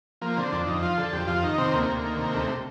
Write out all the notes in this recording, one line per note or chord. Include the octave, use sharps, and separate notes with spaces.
F3 A#3
D3 C4
F2 D4
F2 D#4
F3 F4
D3 A4
F2 G4
F2 F4
D#3 D#4
C3 C4
D2 A#3
D2
D#3
C3
D2 A3